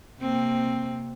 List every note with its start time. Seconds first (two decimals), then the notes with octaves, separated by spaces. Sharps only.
0.20 C3 A#3 C4